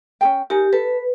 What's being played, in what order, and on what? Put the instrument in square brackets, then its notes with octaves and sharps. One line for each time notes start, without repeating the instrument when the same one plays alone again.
[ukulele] C#4 G#4 G5
[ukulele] D#4 A#4 G#5 [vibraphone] G4
[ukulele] A4 [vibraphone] B4